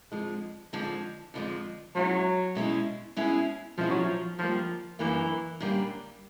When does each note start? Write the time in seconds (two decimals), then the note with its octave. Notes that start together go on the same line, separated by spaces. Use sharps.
0.12 F2 D3 F3 G#3
0.73 F2 D3 F3 G#3
1.34 F2 D3 F3 G#3
1.95 B2 F#3 G#3 C#4 E4 G#4
2.55 B2 G#3 C#4 E4 G#4
3.17 B2 G#3 C#4 E4 G#4
3.78 B2 F3 G#3 C#4 E4 G#4
3.90 F#3
4.04 F3
4.38 F#2 D3 F3 G3 A#3
4.99 F#2 D3 E3 G3 A#3
5.60 F#2 D3 G3 A#3